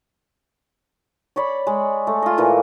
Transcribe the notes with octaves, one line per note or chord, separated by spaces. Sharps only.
C#5 D5 B5
G#3
A3
F4 D#5
A#2 E3 A#3